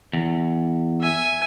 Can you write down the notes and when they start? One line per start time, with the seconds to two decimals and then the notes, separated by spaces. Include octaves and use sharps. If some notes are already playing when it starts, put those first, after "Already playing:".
0.13 E2
1.01 E5 G#5